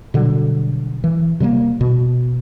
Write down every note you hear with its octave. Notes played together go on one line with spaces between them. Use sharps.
B2 D3 F#3 G3
E3
C3 G3 A3 A#3
B2